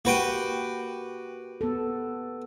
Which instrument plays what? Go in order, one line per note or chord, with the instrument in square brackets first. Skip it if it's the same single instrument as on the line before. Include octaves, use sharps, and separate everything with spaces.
[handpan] A#3 G4 [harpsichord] F#4 B4 G5
[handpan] B3 A4